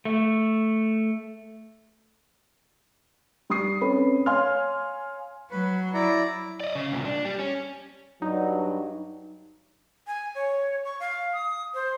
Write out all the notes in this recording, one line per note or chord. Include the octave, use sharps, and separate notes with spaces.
A3
G3 C#6 D#6 C7
C4 C#4 A4 B4 B5
C#5 F5 G#5 C6 F6
F#3 B4
E4 D5 A#5
D5 D#5
C#3
C2 A#2
D4
G3
C#4
G2 F#3 D#4
G#5
C#5
C#6
F5
D#6
C5